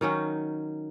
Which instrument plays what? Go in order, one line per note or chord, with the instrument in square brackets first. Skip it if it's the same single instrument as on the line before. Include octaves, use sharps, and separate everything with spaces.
[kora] D#3 F#3 C#4 D#4